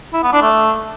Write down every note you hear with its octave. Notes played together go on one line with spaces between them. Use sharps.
E4
B3
D4
A3